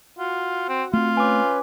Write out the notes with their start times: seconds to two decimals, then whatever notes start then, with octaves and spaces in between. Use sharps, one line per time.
0.18 F4 F#4 F#5
0.69 C4
0.93 A3 C4 F4
1.17 C#4 B4 G#5 D6